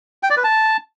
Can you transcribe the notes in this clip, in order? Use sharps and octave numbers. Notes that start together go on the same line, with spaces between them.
G5
D5
B4
A5